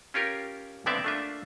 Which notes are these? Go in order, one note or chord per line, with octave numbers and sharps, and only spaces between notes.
C#4 F4 G4 A#4 C#5
G2 D3 B3 C4 D5 E5
A3 A#3 D4 F4 E5